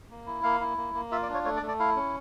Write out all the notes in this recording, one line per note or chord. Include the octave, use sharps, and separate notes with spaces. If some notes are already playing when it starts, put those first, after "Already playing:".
A#3
E4
A#3 F5
E4
A#3
A#3
F4 E5
D5
D4
C#5
A3 C#5
D5
A3
D5
E4 F5
C#4